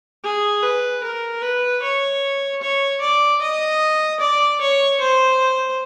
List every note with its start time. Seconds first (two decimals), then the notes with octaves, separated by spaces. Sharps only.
0.24 G#4
0.63 B4
1.03 A#4
1.42 B4
1.82 C#5
2.62 C#5
3.01 D5
3.42 D#5
4.20 D5
4.60 C#5
5.00 C5